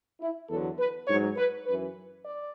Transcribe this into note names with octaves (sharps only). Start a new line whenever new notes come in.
E4
E2 D3 F#3 A4
B4
G#2 F#3 C#5
B4
F#2 E3 B4
D5